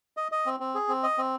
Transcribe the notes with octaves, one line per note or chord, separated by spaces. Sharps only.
D#5
D#5
C4
C4
G#4
C4
D#5
C4